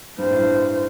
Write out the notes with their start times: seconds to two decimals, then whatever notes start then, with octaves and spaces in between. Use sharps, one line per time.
0.18 G2 C5
0.30 A2
0.39 G2